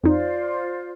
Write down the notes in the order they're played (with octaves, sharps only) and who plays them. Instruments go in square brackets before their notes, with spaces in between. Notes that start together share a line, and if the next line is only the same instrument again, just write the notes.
[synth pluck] F2 D#4 [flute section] F4 C5 D5